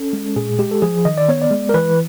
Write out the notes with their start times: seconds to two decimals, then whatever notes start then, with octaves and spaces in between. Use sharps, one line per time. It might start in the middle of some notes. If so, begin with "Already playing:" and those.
Already playing: C#4 A4
0.13 G#3
0.36 A#2 G#4
0.59 G#3 G4
0.71 A4
0.82 F3 G#4
1.05 D#3 D#5
1.18 D5
1.28 B3 C#5
1.42 D5
1.51 G#3
1.69 A#4
1.74 E3 B4